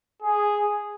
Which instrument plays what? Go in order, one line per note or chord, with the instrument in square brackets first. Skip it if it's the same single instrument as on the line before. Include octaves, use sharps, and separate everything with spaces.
[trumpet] G#4